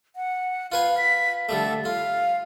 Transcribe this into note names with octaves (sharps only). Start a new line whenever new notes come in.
F#5
F4 B4 F5 G#5
B6
D3 G3 A3 A4
F4 F5